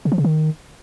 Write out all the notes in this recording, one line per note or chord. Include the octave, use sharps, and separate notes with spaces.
C#3
F3
C#3
D#3